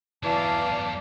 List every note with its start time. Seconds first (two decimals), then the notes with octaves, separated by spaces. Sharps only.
0.23 E2 E3 F#3 D5 F5 A5